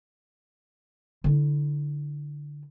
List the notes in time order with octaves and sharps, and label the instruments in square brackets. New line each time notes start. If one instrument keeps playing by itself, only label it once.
[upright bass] D3 E4